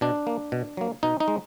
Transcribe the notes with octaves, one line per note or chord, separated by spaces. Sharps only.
B2 D4
A#3
B2
F#3 A#3
B2 D#4
D#4
G#3